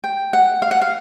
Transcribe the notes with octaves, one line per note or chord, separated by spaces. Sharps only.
G5
F#5
F5
F#5
F5